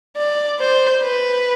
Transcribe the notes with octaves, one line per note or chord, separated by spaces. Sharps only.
D5
C5
B4